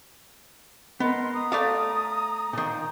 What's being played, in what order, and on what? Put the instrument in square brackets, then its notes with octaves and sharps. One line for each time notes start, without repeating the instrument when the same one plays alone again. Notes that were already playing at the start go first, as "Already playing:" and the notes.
[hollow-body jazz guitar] B3 [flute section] A#4 D#5 C6
[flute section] A#5 D#6
[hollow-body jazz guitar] A3 D5 F5
A#2 D#3